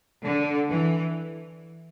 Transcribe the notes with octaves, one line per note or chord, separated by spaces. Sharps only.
D3
E3